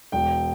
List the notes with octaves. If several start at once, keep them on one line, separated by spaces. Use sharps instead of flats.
E1 G5